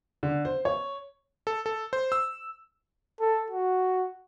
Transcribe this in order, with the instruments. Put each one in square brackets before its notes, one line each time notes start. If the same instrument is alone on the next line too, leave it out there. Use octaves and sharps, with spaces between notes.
[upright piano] D3
C5
C#5
[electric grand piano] A4
A4
C5
E6
[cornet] A4
F#4